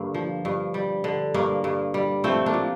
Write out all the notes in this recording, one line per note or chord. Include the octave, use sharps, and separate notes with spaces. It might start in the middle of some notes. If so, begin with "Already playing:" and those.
Already playing: G2 D3 A#3
F3
G2
G3
D3
G2 A#3
G2
G3
F3 A3 C4
A#3 D4
A#2